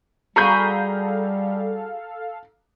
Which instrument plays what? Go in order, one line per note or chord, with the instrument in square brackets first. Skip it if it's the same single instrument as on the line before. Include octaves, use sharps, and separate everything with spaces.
[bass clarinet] G3 [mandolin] F#4 G#4 B5 [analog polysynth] A4 F5 [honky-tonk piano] A#5 G6